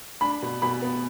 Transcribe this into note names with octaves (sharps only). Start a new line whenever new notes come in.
D4 B5
B2
B2 B5
B3